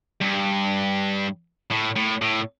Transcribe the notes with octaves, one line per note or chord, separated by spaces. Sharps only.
G2
A2
A2
A2